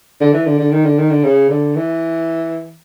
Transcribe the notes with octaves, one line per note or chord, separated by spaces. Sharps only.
D3
E3
D3
D3
D#3
D3
D#3
D3
C#3
D3
E3